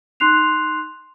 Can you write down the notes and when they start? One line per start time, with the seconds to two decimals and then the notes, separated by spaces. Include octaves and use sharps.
0.20 D#4 C6 F#6 C7 F7